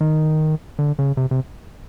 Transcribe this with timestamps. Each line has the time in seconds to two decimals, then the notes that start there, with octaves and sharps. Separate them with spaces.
0.01 D#3
0.79 D3
0.99 C#3
1.17 C3
1.31 C3